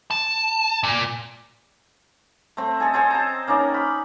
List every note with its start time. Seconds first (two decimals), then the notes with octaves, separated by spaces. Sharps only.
0.11 A5
0.83 A#2
2.57 A3 C4
2.80 A4 D#5 G#5
2.94 C4 A4 C5 G#5
3.11 A5 A#5
3.47 A#3 C#4 D#4 D5
3.74 B5